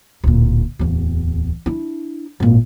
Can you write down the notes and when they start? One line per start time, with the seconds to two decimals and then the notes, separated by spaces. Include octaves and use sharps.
0.24 D1 A#2
0.79 D1 E2
1.66 D4 E4
2.40 G#1 A#2